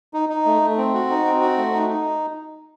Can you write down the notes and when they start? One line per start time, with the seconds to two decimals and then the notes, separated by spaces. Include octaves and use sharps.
0.14 D#4
0.29 D#4
0.46 A3
0.62 A3
0.78 C4
0.94 F#4
1.10 D#4
1.25 C4
1.41 F#4
1.57 A3
1.73 D#4
1.89 D#4